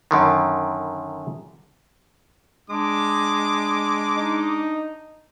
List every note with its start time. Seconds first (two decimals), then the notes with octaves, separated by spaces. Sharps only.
0.11 F#2 D3 D#3
2.70 G#3 D4 D6
4.16 D#4